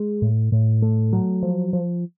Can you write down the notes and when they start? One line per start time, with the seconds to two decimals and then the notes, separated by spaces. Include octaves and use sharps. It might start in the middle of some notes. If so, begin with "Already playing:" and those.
Already playing: G#3
0.22 A2
0.52 A2
0.82 A3
1.13 F#3
1.43 F3
1.73 F3